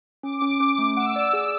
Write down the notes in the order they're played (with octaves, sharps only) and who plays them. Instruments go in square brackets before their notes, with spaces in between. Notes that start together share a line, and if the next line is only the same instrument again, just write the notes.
[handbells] C#4 [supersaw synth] D6
[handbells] C#4
C#4
A3
[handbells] F#5 [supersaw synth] E6
[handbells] D5
G#4